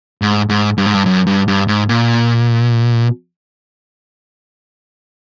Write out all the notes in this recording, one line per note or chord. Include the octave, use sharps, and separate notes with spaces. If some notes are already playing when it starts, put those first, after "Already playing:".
G#2
G#2
G2
G#2
G2
F#2
G2
G2
G#2
A#2